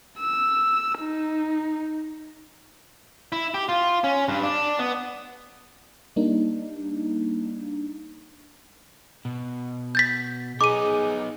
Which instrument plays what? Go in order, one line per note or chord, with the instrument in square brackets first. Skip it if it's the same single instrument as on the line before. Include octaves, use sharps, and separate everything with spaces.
[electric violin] E6
D#4
[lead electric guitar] E4
G4
F4
C#4
G2
D4
B3
[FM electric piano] G3 A#3 D4 D#4
[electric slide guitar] B2
[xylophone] G6 A6 B6
[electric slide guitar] B3 D#4 [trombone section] G#4 [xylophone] D6 D#7